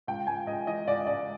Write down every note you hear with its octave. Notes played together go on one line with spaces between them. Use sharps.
C#2 G5
C#2 G#5
C#2 D#5
E3 D#5
C#2 D5
C#2 D5